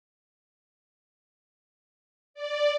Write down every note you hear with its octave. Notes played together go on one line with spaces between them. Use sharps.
D5